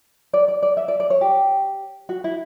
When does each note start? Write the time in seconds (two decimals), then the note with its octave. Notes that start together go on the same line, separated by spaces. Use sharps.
0.33 D5
0.48 D5
0.63 D5
0.77 E5
0.88 D5
1.00 D5
1.10 C#5
1.21 G4
2.09 F#4
2.24 E4